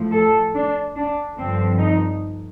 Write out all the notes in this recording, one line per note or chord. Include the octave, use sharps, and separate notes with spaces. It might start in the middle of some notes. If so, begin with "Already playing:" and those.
Already playing: A2 F3
A4
D4
D4
G2 D3 F3 C4
D#4